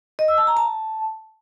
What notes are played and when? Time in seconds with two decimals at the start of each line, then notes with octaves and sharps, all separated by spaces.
0.19 D#5
0.28 E6
0.38 A5
0.47 A#5
0.57 A5